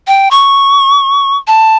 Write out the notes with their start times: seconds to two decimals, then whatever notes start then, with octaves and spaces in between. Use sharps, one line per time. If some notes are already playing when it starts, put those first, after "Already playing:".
0.07 G5
0.31 C#6
1.47 A5